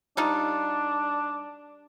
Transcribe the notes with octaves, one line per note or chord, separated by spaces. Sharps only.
G3 D4 D#4 F4